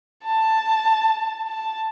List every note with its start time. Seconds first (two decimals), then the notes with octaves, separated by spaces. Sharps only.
0.25 A5
1.48 A5